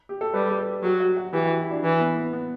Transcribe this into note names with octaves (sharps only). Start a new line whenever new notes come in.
G4
A4
G3 B4
G4
A4
F#3 G4
F#4
F#4
E3 G4
F#4
E4
D4
E3
B3
B3
B3